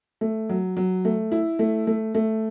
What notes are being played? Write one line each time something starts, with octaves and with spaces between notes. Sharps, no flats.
A3
F#3
F#3
A3
E4
A3
A3
A3